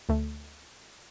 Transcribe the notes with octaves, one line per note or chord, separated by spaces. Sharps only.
D2 A3